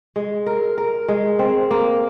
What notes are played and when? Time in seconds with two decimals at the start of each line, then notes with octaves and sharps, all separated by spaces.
0.16 G#3
0.46 A#4
0.78 A#4
1.08 G#3
1.39 C4
1.71 A#3